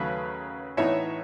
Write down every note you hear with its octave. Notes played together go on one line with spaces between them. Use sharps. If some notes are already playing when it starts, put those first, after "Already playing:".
Already playing: D#2 C#3 F#3 A3 B4
A2 E3 B3 D#4 C#5 E5